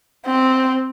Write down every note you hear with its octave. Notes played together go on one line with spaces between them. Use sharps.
C4